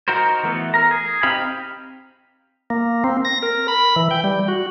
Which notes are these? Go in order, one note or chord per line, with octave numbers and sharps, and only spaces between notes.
D#4 F#4 A#4 C5
E3 A3 B3
A#4 A#5
G#4
C4 D#4 G4 F5 B5
A#3
C4
A#6
A#4
B5
E3
G5
G3
F#4